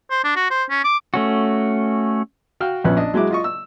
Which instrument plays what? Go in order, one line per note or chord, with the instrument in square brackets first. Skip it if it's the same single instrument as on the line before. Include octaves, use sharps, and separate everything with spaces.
[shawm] C5
D4
F#4
C5
C#4
D6
[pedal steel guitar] A3 C#4 F#4
[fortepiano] F#4 F5 G5 F6
A#1 F2 B3 C#4 F#6
D4 D#5
F#3 G#3 E4 D6
F4 D#5 C#6
E6